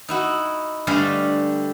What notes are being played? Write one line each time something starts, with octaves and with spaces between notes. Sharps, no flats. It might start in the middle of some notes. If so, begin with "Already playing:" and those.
D#4 E4 F#4
G2 D3 G3 A3 F5 G#5